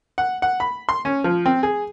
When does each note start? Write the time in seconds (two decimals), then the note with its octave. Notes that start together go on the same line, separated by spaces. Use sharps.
0.18 F#5
0.42 F#5
0.60 B5
0.89 C6
1.05 C#4
1.24 F3
1.46 C4
1.63 G#4